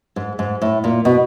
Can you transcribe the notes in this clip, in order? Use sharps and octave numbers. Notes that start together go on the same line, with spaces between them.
G#2
G#2
A2
A#2
B2